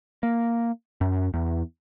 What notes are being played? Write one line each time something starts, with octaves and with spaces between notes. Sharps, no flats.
A#3
F#2
E2